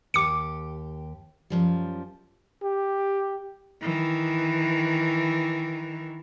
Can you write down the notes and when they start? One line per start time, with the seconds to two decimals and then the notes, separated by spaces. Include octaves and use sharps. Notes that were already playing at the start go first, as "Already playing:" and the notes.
0.14 D#2 G4 D6 C#7
1.50 F#2 F3 G3
2.63 G4
3.82 D#3 E3